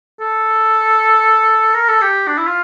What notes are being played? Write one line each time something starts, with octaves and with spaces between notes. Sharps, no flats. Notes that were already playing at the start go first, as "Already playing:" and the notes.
A4
A#4
A4
G4
D4
E4
F4